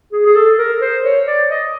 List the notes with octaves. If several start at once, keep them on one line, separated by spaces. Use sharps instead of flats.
G#4
G#4
A4
A#4
C5
C#5
D5
D#5